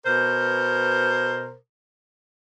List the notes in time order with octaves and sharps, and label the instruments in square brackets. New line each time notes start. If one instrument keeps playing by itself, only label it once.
[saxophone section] B2 A#4 C5